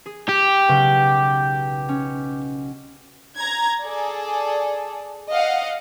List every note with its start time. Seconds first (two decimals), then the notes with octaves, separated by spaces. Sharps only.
0.06 G#4
0.29 G4
0.68 B1 C#3 C#6
1.89 C#4
3.36 A#5 G#6
3.82 G#4 A4 D5
5.29 D#5 F5 F#5